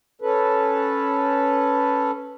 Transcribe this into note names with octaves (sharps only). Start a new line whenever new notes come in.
C#4 A4 B4